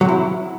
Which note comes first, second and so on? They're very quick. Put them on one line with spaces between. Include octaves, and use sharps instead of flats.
F#3 C3 E4